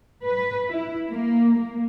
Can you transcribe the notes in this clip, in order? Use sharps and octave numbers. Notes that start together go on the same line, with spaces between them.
B4
E4
A#3
A#3